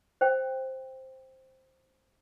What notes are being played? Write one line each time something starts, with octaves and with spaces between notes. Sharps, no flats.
C5 G5